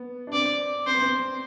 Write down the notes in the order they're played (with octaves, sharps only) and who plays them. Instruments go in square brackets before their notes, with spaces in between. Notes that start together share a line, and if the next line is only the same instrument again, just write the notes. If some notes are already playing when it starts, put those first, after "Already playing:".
Already playing: [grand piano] B3
D4
[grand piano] C4 [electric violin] D5
[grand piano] C4 [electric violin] C5
[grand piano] B3
C4